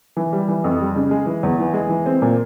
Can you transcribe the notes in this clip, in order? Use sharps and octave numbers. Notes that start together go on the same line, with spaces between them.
E3
G3
E3
F2
G3
C#3
G#3
E3
E2
E3
G#3
E3
C4
A#2